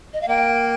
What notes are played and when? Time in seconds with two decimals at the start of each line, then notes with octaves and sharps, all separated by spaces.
0.13 D#5
0.22 F5
0.28 A#3 G5